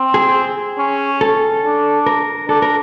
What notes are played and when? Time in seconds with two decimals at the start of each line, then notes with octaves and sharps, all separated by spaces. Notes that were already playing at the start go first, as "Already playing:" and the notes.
Already playing: C4
0.14 G#4
0.78 C#4
1.21 A4
1.64 D4
2.06 A#4
2.48 D4 A4
2.62 A#4